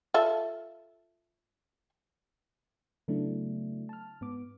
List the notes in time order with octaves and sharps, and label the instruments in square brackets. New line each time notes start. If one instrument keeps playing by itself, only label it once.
[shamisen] F4 A4 E5
[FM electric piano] C#3 F#3 A3 B3 D4 E4
A5 F6
G#2 B3 D6